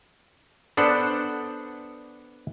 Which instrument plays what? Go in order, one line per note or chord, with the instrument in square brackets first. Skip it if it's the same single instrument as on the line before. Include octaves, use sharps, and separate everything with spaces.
[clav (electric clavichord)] B3 D4 A4 C5 D5 F#5